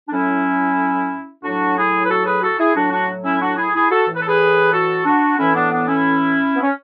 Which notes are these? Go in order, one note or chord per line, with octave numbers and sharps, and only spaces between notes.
D4
A2 F#3 C#4 E4
A2 F#3 D4 F#4
E4 G#4
B4
F#4 A4
G#4 B4
F#4 A4
E4 G#4
A2 F#3 D4 F#4
D4 F#4
C#4 E4
D4 F#4
E4 G#4
E4 G#4
F#4 A4
A2 E3
B4
A4
G#4 B4
F#4 A4
D4 F#4
A2 E3 C#4 E4
B3 D4
B3 D4
C#4 E4
B3
C#4